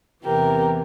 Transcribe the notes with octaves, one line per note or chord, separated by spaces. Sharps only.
E2 C3 E3 G4 A#4